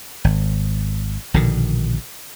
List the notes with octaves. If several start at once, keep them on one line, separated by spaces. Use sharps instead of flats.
G#1
A#1 B2 D3 D#3